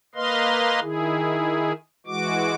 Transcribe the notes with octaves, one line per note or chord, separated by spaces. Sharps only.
A#3 B4 D#5 F5 C6
D#3 E4 G#4
E3 G#3 F#4 D6